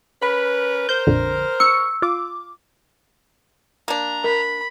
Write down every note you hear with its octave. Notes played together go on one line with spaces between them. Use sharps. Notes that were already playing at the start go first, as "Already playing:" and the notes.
C#4 A#4 B4 B5
A#4 C5 G6
A#1 F2 D3
C#6 E6 C#7
F4 D6
A#3 D4 A#5
A#4 B5